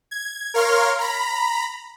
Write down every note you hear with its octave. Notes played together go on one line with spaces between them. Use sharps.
G#6
A#4 C#5 F5 C6 F6
A#5 B5